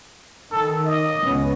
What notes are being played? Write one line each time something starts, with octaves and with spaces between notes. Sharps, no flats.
D#3 A4
D#5
C#2 B3 C#4